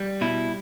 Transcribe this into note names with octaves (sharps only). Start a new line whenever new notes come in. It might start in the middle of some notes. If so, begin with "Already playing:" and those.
Already playing: G3
B2 E4